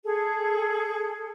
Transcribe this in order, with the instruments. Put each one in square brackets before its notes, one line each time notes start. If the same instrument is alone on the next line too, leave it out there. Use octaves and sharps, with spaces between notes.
[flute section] G#4 A4